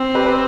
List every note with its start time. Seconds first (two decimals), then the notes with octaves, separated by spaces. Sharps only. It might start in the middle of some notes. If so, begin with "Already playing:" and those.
Already playing: C4
0.15 G4 B4
0.25 G4 B4